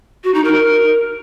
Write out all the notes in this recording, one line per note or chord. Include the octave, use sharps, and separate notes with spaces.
F#4
D#4
A#4